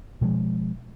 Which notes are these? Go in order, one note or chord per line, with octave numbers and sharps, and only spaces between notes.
B2 F3 G#3